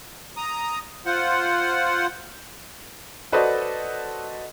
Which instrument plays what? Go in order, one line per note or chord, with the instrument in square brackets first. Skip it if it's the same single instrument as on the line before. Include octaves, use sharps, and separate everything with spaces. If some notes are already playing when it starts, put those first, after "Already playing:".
[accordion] A#5 D#6
F4 C5 F#5
[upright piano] F#4 A4 B4 C5 D5 D#5